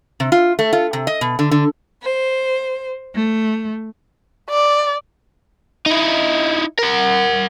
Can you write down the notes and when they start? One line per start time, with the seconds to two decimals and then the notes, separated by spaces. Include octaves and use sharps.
0.20 C3
0.32 F4
0.59 A3
0.73 F4
0.93 C3
1.07 D#5
1.21 B2
1.39 D3
1.51 D3
2.04 C5
3.14 A3
4.50 D5
5.86 D#4 E4
6.79 A#4 F#5